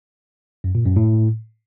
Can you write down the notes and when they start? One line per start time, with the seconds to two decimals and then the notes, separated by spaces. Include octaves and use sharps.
0.64 F#2
0.75 A#2
0.86 F#2
0.96 A2